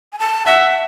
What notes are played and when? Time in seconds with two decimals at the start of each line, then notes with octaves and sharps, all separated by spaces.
0.13 G#5
0.19 A5
0.46 E5 F#5